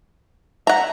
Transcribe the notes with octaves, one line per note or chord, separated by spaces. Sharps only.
E5 F#5 A#5